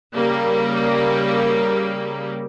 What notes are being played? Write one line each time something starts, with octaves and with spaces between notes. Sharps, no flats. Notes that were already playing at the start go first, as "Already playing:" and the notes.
C#3 G3 A#3